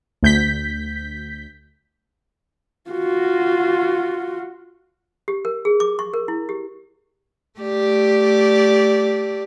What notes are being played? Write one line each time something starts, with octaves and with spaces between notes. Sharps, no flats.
D2 G6 B6
F4 F#4
G4
A#4
G#4
D6
C#6
A#4
E4
G4
A3 G4 D5